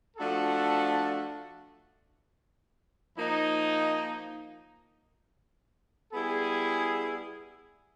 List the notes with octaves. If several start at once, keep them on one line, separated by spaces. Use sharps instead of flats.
F3 A3 D4 F#4 A4
F3 A#3 D#4
G3 B3 E4 G#4